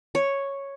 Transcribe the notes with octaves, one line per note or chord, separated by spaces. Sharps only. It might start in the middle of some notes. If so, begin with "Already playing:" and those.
C#5